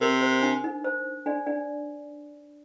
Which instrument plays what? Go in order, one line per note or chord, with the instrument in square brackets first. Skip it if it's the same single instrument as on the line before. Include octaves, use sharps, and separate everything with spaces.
[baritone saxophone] C3 [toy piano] A#4
[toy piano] C5
D4
D#4
C5
D4 D5
D4 D5